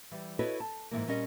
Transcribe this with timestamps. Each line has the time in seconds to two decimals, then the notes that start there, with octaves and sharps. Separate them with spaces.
0.11 E3 G3
0.39 E4 F#4 A4 B4 C#5 D#5
0.60 A5
0.91 G#2 C#3 E3 A#3
1.07 A#2 G3 C#4 A#4 D#5